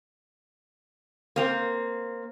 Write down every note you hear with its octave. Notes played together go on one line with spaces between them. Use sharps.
A#3 C4